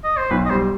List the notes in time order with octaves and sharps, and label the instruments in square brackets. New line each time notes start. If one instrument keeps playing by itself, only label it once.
[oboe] D#5
C5
[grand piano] B1 [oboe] B4
[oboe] D#5
[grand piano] G3 [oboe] C5